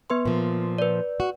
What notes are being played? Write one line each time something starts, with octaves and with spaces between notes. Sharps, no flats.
B3 B4 C6
A#2 F3
B4 D5
F#4